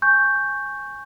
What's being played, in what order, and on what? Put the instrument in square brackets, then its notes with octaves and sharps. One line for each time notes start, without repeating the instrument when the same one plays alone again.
[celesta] G#5 C#6 G6